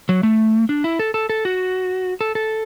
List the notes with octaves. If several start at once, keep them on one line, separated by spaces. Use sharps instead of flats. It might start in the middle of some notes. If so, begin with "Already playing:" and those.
F#3
A3
D4
E4
A4
A4
A4
F#4
A4
A4